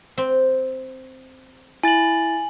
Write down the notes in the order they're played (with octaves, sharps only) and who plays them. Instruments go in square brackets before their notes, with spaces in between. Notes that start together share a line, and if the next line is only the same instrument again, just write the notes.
[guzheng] C4
[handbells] E4 A6 [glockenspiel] G#5 F#7